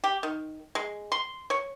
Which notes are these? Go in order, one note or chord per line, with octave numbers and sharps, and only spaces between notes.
G4
D#3
G#3
C6
C#5